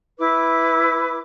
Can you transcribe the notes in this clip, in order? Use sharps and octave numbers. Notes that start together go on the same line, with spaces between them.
E4 B4 D6